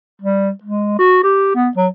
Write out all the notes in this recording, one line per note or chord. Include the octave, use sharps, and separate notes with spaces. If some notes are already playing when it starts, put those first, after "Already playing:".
G3
G#3
F#4
G4
B3
F#3